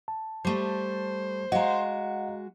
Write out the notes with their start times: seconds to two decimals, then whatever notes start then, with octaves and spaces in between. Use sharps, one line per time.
0.08 A5
0.45 G3 A3 C5
1.52 G#3 F#4 D#5 F5 F#5 A#5